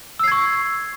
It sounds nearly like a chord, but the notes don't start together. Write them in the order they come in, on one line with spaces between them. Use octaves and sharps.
E6 C7 G#6 C#6